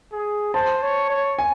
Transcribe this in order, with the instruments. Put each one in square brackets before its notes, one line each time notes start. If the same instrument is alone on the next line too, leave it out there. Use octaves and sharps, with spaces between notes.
[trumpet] G#4
[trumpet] C5 [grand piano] A5
[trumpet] C#5
C#5
[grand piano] G#5